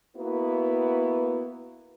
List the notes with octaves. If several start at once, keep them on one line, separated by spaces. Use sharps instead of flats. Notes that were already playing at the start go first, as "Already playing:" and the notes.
A#3 B3 E4 F#4 B4